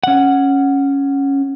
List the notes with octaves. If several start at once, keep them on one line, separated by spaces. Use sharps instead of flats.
C#4 F#5